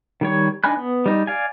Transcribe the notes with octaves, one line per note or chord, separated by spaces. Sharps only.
D#3 G3 C#5
D4 D#4 G#5 B5 F#6
B3
G3 D#4
D5 F5 G#5